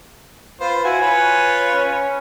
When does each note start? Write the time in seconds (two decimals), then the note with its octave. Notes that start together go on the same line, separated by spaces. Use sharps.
0.61 F4 B4 C5
0.85 E4 F#4 G#5
1.01 F4 B4 C#5
1.73 C#4